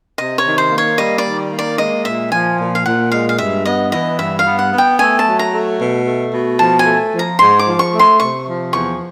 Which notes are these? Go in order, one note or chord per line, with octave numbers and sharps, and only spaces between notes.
C3 D#5
C#5
D#3
C5
A#3
C#5
G3 D#5
D5
D#3
A#3
D5
G#3 D#5
A#2 E5
F3 G#5
A#2
F5
A#2 F#5
G#3 F5
F5
G2 E5
B3 D#5
E3 D#5
G2 E5
F5
B3
F#5
B3
G5
A3 G#5
A5
F#3
A#5
A3
B2
A3
B2
F3 A5
G#5
A3
F3
A#5
G#2 C6
D6
F3
C#6
A3
C6
C3 C#6
F3
E2 C#6